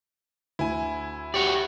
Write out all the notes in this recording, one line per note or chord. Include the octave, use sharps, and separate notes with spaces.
D2 E4 G#5
F#4 G4 C#5 D5